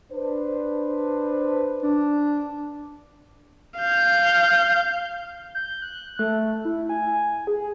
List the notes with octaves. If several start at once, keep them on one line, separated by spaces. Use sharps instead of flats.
D4 B4 C5
D4
F5 G6
G6
F#6
A3
E4
G#5
G#4